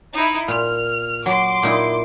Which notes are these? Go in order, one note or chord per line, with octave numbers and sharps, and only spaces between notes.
D#4 E4
A#2 F6
F#3 C6 D6
A#2 D#4 E4